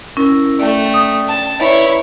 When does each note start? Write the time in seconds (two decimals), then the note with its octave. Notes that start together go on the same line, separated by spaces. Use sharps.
0.17 C#4 E4 A#4
0.60 A3 D5 G5
0.94 D#6
1.28 A5
1.60 E4 B4 C#5 D5 A#5